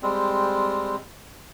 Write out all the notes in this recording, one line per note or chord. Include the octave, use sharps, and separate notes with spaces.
G3 G#3 C4